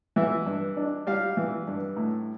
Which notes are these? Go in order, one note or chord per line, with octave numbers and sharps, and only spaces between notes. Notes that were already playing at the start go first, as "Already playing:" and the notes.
E3 E5
G2
D4
G3 F5
E3
G2
A2